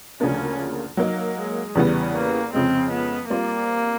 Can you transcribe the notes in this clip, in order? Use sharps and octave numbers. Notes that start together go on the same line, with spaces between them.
D2 C#3 F3 A#3 C#4 D4
F#3 A#3 D#4
G#3
E2 C#3 E3 G3 B3
A#3
F2 C#3 F3 G#3 C4
B3
G3 A#3 C4 F4 A#4 D5